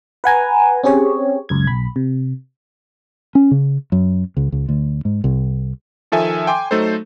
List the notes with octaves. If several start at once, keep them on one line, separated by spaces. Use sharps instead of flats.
B4 F#5 G#5 A#5
C4 C#4 G4 G#4 C#5
C#2 F#2 G#6
B1 B5
C3
C#4
C#3
F#2
C#2
C#2
D2
G#2
C2
D#3 F3 A4 E5 G#5
G5 G#5 C6 D6
F#3 A3 D#4 A4 C5